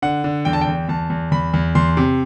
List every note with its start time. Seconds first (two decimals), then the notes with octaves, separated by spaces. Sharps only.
0.02 D3 F#5
0.24 D3
0.45 E2 G5
0.53 A5
0.61 G5
0.67 E2
0.89 E2 A5
1.10 E2
1.31 E2 B5
1.53 E2
1.75 E2 C6
1.97 C3